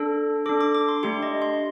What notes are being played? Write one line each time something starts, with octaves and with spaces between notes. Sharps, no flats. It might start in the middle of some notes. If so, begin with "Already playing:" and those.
Already playing: D4 A4
D4 A4 D6
D6
D6
C6
A3 D4 G4 C6
D#5
C6